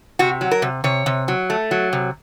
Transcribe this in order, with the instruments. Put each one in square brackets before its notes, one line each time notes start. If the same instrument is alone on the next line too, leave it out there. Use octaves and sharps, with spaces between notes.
[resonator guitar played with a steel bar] C3 F#4
F#3
A#4
C3
C3 C#5
C3
F#3
A3
F#3
C3